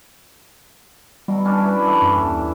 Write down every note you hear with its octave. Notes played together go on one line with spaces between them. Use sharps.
B2 F#3 G3
C#4 D4
E4 B4
E3 A4
F#2
D#2